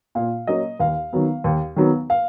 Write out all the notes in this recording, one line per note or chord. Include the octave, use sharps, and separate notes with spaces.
A#2 F5
F#3 A#3 C#4 D#5
D#2 F5
D#3 F#3 B3
D#2
D#3 F#3 B3
F5